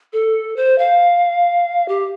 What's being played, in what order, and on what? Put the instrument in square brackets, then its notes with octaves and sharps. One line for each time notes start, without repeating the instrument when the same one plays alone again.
[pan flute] A4
C5
F5
G4